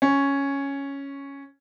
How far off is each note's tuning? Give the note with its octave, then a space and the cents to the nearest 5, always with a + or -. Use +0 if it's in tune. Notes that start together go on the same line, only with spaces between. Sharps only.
C#4 +0